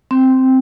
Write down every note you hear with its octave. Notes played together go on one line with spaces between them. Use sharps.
C4